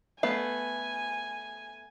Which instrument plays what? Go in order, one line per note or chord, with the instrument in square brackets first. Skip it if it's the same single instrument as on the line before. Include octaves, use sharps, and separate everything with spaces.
[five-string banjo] A3 B3 F5 [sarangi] G#5